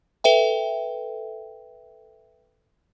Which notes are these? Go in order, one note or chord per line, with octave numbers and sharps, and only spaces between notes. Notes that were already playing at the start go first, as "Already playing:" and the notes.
A4 B4 E5 G5